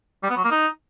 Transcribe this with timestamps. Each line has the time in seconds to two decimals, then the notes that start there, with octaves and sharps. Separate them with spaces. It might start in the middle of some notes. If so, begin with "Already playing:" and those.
0.23 G3
0.30 B3
0.37 F#3
0.44 A#3
0.51 D#4